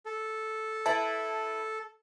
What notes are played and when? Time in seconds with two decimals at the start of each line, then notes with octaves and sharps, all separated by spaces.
0.06 A4
0.86 E4 B4 A5